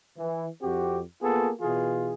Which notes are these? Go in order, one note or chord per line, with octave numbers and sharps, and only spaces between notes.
E3
F2 C4 F#4 G4
A#3 B3 F4 G#4 A4
B2 E3 F4 G#4